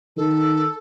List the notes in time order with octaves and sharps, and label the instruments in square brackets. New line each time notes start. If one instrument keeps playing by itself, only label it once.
[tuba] D#3 [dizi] A4